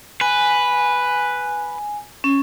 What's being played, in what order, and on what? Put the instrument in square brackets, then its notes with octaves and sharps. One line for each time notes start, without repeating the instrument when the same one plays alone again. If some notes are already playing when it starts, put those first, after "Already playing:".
[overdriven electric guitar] B4 [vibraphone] G#5
[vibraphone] C#4